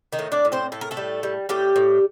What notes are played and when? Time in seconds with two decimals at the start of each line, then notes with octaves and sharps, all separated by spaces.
0.12 D#3 D#4
0.19 A2
0.32 D4 D5
0.45 A2
0.52 C4 C5
0.72 A2 A4
0.81 A#4
0.91 A3 A4
0.97 G3
1.23 G3
1.49 A2 G3 G4
1.76 A2